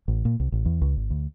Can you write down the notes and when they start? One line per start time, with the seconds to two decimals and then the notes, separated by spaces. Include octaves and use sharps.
0.08 A1
0.25 A#2
0.40 C2
0.52 A1
0.66 E2
0.82 C#2
0.96 G#1
1.10 D2